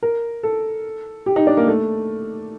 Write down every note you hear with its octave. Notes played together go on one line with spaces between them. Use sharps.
A#4
A4
G4
D#4
D4
A#3
A3